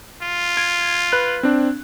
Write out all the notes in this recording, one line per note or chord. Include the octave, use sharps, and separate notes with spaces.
F4
G#6 D7
B4 F#6
C4 D4